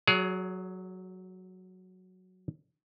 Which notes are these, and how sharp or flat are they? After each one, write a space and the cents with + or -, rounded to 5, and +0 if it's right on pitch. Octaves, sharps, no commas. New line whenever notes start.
F#3 +0 G#4 +15 C#5 +45